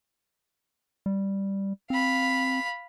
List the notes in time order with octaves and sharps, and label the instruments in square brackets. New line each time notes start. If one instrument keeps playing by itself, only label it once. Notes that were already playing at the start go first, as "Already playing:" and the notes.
[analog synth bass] G3
[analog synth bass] C4 [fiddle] F5 B5